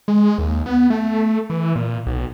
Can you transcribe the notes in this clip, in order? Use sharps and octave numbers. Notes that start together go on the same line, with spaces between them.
G#3
D#2
B3
A3
E3
A#2
B1